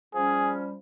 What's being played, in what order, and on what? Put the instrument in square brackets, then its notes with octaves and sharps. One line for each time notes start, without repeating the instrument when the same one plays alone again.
[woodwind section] F3 G3 C#4 [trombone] G#4